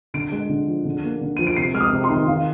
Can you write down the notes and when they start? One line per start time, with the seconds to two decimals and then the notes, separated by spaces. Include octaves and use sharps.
0.14 D3 D7
0.32 G#3
0.49 D3
0.68 F3
0.85 D3
1.04 A#3
1.21 D3
1.37 F3 D#7
1.47 D7
1.56 C3 C7
1.74 G#3 F6
1.80 D#6
1.93 C3
2.04 C6
2.10 D#3
2.28 D#3 F5